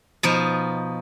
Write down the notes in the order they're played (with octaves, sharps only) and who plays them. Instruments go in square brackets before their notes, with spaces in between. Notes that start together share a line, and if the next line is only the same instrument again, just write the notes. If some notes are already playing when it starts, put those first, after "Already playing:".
[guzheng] B2 F3 D#4